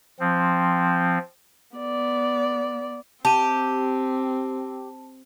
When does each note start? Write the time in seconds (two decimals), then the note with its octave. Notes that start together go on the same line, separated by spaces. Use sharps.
0.20 F3 C4
1.76 B3 D5
3.25 C4 G4 A5 D#7